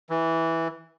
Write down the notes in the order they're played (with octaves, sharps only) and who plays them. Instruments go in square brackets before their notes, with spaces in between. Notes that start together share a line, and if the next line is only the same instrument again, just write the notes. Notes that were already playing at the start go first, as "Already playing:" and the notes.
[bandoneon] E3